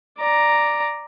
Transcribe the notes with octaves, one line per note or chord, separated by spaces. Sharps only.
D5 A#5